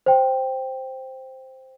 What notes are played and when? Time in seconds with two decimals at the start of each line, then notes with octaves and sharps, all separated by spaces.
0.06 C5 G5